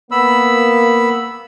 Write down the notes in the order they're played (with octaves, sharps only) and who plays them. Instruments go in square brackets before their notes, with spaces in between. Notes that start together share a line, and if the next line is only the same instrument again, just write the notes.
[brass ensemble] A#3 [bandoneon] B3 B5 E6